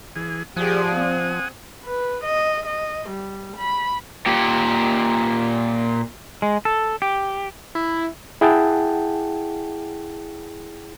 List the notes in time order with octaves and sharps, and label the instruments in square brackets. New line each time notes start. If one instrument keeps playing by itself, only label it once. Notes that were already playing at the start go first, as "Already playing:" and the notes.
[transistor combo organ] E3 G#4
[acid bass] F3 [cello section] G4 G#4 D5 [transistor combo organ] F#5 G#5 D#6
[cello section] C4
[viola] B4
D#5
D#5
G3
B5
[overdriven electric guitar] A#2 G4
[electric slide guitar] G#3
A4
G4
[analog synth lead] E4
[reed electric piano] E4 G#4 F#5 G5 A5